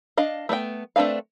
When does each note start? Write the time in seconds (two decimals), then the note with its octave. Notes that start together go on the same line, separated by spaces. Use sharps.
0.17 D4 D#5 F5
0.49 A3 B3 D5 G5
0.96 A3 C4 D4 B4 F5